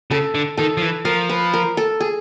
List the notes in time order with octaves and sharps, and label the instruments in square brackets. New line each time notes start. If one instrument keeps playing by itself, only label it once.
[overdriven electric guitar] C#3 [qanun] A4
[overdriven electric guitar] D3
[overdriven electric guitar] D#3 [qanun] A4
[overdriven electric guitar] F3
E3
[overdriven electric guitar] F3 [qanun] A#4
[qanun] B4
A#4
A4
G#4